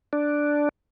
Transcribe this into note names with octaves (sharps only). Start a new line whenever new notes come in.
D4